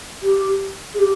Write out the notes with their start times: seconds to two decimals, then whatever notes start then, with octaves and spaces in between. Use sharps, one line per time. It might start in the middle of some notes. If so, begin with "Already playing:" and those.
0.23 G4
0.94 G#4
0.99 G4